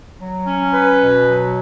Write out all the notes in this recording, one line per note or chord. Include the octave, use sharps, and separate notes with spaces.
F#3
C#4
B4
B2
F#3